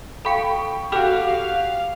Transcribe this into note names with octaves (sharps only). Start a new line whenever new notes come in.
A4 F5 G5 B5 C#6 C#7
F#4 G4 A4 F5 D6 F6 F7